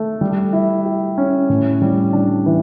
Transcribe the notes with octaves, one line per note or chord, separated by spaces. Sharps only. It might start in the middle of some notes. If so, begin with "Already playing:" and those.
Already playing: A3
G3
E4
G4
C#4
A2
G3
D4
E3